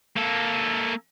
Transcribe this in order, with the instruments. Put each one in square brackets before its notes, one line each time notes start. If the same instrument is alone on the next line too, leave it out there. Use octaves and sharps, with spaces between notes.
[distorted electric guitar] A#3 A4